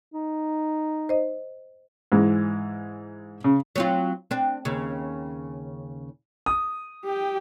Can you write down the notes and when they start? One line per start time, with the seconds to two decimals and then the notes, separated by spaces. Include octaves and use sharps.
0.14 D#4
1.09 C5 D#5
2.12 G#2 E3 G#3
3.44 C#3
3.76 F#3 C4 F4
4.31 C4 D4
4.65 D#2 C#3
6.46 D#6
7.04 G4 G5